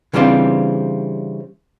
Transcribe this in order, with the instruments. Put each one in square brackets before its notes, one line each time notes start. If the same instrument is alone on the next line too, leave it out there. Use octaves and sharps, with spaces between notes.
[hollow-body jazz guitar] C#3 E3 G3 C4 D4 F4